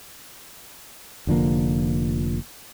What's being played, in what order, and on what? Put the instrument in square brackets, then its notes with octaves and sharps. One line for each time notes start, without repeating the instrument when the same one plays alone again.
[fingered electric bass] F1 D3 F3 A#3